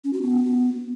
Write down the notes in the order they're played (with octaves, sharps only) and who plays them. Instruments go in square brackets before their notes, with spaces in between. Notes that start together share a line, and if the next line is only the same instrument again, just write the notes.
[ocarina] C#4
F#4
B3